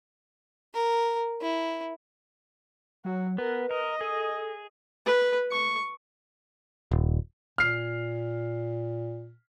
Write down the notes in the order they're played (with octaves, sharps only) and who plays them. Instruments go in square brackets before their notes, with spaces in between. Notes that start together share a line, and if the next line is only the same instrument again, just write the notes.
[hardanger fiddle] A#4
E4
[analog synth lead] F#3 [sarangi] F#4
[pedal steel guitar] B3 [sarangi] A#4 [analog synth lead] B4
[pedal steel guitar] A#4 [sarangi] D#5
[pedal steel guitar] G#4 [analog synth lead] A4
[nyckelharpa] B4
C#6
[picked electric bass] D#1
[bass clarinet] A#2 [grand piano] F6 C7